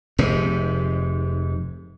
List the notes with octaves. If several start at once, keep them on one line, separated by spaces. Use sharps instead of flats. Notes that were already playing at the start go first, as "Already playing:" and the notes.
F1 G#2 C3